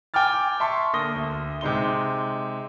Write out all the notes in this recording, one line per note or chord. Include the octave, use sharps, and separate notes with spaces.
G5 G#5 D6 F6 A6
E5 A5 C6 C#6
D3 A#3 D#6 A#6 G7
D2
C3 G#3 D#4 C6 G7